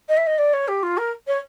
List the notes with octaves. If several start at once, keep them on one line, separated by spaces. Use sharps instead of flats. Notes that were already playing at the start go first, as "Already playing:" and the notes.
D#5
E5
D#5
D5
C#5
G4
F4
A#4
C#5